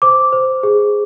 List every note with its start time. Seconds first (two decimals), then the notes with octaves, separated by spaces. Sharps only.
0.02 C5 D6
0.33 C5
0.63 G#4